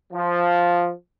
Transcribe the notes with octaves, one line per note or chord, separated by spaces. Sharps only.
F3